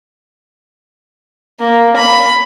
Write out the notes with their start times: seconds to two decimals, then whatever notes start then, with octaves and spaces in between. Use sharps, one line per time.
1.60 A#3
1.97 B5